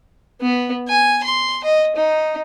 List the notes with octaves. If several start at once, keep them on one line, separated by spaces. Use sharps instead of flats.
B3
G#5
C6
D#5
D#4